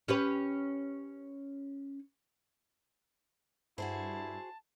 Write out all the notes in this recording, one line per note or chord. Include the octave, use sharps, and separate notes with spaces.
C#4 G4 B4
G2 E4 F#4 G#4 C5 A5